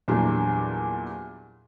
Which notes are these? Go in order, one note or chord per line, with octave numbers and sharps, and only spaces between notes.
E2 A#2 F#3 G3 D4